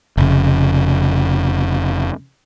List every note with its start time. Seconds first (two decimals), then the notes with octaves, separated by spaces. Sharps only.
0.17 F1 C#3